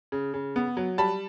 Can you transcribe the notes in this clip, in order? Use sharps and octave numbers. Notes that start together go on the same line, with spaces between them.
C#3
C#3
B3
F#3
G3 A5 B5